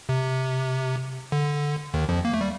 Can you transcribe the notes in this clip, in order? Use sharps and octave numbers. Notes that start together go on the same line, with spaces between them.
C3
D3
D#2 D#3
F2 F3
A#3
A3
G3